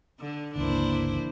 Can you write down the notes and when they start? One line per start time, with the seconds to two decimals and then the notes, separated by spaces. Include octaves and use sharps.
0.19 D3
0.56 G1 C#2 D3 E3 A#3 D4 E4 C5